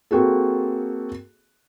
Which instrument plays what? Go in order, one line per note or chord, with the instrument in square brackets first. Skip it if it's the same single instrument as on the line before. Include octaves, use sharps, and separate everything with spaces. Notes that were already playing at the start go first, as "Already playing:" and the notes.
[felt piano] A#3 C4 F#4 G#4 A4